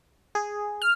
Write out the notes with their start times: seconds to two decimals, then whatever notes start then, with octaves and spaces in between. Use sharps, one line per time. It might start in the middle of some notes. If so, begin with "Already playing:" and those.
0.35 G#4
0.82 F6